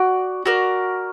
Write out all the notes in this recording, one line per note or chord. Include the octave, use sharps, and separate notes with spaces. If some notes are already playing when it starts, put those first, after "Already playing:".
Already playing: F#4 D5
F#4 A#4 D5